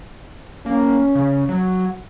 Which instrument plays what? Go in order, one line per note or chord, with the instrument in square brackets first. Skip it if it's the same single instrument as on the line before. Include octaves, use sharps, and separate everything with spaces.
[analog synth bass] A#3 [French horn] C#4
[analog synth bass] C#3
F#3